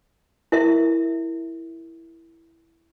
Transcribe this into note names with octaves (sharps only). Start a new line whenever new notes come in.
E4 A#4 E5